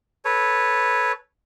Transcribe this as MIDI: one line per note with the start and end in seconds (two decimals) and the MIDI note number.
0.25 1.12 69
0.25 1.12 71
0.25 1.12 73